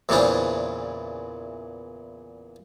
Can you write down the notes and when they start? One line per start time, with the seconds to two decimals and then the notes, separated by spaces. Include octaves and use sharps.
0.09 E2 A#2 C#3 E3 D4 C5